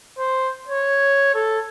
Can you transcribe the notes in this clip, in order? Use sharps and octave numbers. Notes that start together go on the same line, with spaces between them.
C5
C#5
A4